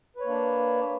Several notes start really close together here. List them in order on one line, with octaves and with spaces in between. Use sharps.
B4 C#5 A#3 D4